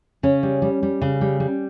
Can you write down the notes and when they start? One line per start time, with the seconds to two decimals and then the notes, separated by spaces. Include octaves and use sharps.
0.23 C#3 C#4
0.43 G3
0.62 G3
0.83 G3
1.02 C#3
1.21 G3
1.40 G3